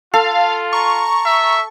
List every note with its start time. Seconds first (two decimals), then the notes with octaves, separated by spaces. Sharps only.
0.14 F4 A4 F5
0.73 A#5 C#6
1.26 E5